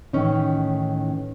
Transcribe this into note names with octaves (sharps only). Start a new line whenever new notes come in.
A2 D#3 E3 A3 C#4 D#4